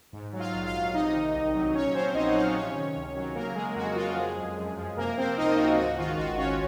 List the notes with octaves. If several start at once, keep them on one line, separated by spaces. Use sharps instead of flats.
G#2
F#3
F4 F5
A#1
F4 F5
A#1
C3 D#4 D#5
D#3
C2
F#3
A#2 C#4 C#5
F3 C4 C5
A#1 D#4 D#5
F#5
A#1 F4 F5
C3 C#4 C#5
D#3
C#2
F#3
C#3 A#3 A#4
F#3 G#3 G#4
F2 F#4
F2 F4
F3 G#3 G#4
F#2
F#2
F3
C3 A#3 A#4
F3 C4 C5
C#2 D#4 D#5
F4
C#2 F#4
G#2 F#4
D#3 F4
G#1 F#4
G#1 C#4 C#5